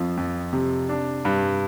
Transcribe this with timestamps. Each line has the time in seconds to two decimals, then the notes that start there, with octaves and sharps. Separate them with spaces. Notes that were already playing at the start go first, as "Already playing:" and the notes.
Already playing: F2 F3
0.17 F2
0.53 C3
0.89 D4
1.25 G2